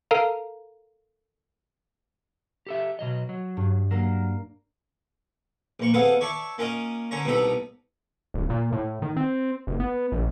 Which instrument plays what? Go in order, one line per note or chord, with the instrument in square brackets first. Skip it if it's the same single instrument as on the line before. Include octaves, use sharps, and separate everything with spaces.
[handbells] A4 A#4 F5 A#5
[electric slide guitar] G4 A4 E5
B2 F#3 D#5
F#3
[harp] G2
[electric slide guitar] F#3 [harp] A#3 A#4
[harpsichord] A#1 A#3 C#6
B3 C4 G#4 A4 F5 F#5
C#5 D5 E5 A5 C#6
A#3 C#4 F4 A#4 D#5
D3 C#4 C#5 A#5
C2 B2 D#4 A4 A#5 B5
[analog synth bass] D1
A#2
A2
D#3
C4
F#1
B3
A#1